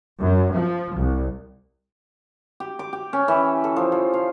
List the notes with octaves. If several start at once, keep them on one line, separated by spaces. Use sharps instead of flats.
F#2
F3
C2
G4
D6
G4
C#4
E3
A4
F3
F3
F5